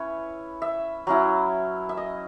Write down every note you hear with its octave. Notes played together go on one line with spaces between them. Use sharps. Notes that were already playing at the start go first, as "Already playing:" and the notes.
Already playing: C#4 E4 B4 C#5
E5
F#3 C#4 E4
E5
D#5